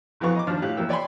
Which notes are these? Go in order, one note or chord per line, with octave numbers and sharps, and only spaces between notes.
A#1 F2 E3 B3 F5 C#6
D#5 A#5 D6
D#2 F3 D4 F6
A2 G4 F5 F#6
E2 A#3 G5 E6
C#5 D5 G5 G#5 B5 C6